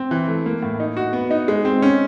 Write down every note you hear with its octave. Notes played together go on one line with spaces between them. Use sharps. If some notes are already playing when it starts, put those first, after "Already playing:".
Already playing: C4
E3
A3
A#3
A2
D#4
F#4
B3
D#4
G#3
C4
C#4